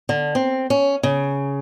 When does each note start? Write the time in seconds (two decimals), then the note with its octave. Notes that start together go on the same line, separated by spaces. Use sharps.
0.09 D3
0.35 C4
0.70 C#4
1.03 C#3